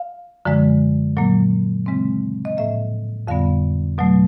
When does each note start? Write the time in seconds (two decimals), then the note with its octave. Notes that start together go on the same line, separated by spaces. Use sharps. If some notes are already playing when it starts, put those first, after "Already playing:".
Already playing: F5
0.45 F#2 D3 F3 G#3
1.17 A#2 F#3 A#3
1.86 C#3 E3 G#3 C4
2.45 D#5
2.57 A2 F3 A#3 E5
3.28 F2 D3 G3 B3 F5
3.98 B2 F#3 A3